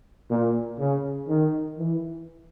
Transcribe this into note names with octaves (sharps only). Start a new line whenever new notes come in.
A#2
C#3
D#3
E3